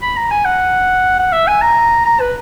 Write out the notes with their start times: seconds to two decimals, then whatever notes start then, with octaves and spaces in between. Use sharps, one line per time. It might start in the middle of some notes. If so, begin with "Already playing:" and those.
0.02 B5
0.16 A#5
0.31 G#5
0.45 F#5
1.19 F#5
1.32 E5
1.48 G#5
1.62 A#5
2.05 A#5
2.20 B4